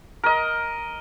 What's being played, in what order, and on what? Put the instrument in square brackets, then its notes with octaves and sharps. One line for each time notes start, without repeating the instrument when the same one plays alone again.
[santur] A#4 D#5